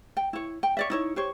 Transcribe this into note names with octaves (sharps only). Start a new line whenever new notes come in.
G5
E4 C#5
G5
C#5 D5 E5
D#4 E4 C#5
G4 C5 C#5